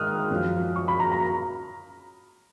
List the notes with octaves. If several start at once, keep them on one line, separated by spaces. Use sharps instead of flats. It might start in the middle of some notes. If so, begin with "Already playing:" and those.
Already playing: G#2 D#3 D#6 F6 F#6
F#2 F3
C#6
B5
A#5
A#5